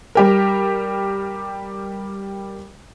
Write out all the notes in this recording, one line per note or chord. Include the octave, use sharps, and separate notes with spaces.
G3 G4 A#4